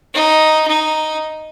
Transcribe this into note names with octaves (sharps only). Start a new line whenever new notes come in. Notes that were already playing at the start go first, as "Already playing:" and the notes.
D#4
D#4